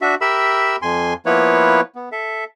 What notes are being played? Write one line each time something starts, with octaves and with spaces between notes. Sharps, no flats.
D4 F#4 E5
G4 A#4 E5 B5 E6
F2 G#5 C6
F3 A#3 B3 E4 B4 C#5
B3
A4 E5